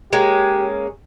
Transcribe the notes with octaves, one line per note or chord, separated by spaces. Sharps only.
G#3 A#3 C#4 G4